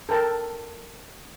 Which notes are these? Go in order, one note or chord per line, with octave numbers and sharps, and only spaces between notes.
A4 A#4 G5 A5 A#5